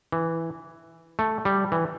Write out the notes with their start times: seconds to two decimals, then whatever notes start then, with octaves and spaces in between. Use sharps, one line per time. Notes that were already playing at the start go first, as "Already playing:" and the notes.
0.12 E3
1.19 A3
1.45 G3
1.72 E3